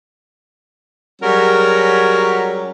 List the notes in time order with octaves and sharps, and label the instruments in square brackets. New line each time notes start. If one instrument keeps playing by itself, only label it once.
[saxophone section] F#3 G3 C#4 F#4 G#4 A#4